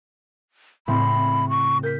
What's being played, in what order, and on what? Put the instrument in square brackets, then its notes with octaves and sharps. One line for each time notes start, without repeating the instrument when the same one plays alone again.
[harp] A2 C#3 C4 [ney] B5
[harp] C#5
[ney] C#6
[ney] A#4 [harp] G6 B6